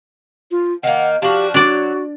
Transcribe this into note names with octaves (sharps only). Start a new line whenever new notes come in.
F4
D#3 A#3 F#5
F3 D4 F#4 G4
F#3 D4 F#4 D5